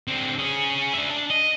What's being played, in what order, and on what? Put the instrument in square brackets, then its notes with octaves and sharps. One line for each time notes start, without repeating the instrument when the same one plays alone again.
[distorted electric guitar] D3 C4
C#4 G#4
D4 E5
D4
D#5